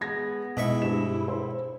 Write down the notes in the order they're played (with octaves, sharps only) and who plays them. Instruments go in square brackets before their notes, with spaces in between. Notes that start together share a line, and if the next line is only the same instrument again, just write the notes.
[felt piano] G#3 G#6 A#6 [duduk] B3
[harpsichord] G#2 E5 C#6 [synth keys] B2 [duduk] E4 [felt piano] D#5
[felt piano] G2 E7
C5